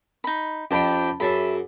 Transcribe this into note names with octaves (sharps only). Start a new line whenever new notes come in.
D#4 B5
F2 C#4 G4 C5 G5 A5 B5
F#2 G#4 E5 A5 B5